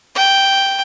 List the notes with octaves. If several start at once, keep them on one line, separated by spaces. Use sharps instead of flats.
G5